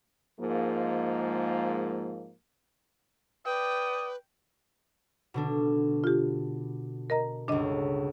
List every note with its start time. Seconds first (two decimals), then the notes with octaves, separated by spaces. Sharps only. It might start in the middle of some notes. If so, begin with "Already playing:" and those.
0.40 G#2 F3 G#3 A#3
3.46 B4 D5 G5 D#6
5.34 B2 D3 D4
6.04 F4 G4
7.10 A#4 D#5 A#5
7.48 G1 C#2 D4 D#5